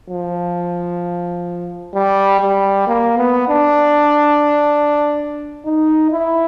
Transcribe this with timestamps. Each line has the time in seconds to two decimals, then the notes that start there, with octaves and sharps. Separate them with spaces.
0.10 F3
1.94 G3
2.41 G3
2.87 A#3
3.17 B3
3.49 D4
5.65 D#4
6.11 E4